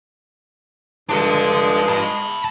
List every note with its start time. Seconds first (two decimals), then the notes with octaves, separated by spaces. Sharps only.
1.09 G2 F3 G#3 D4 A4 D6
1.89 A5 B5